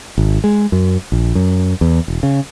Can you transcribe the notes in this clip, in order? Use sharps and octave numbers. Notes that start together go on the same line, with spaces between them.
G#1
G#3
F#2
A#1
F#2
E2
E1
C#3